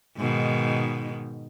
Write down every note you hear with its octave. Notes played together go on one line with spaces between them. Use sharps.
G#2 B2 D#3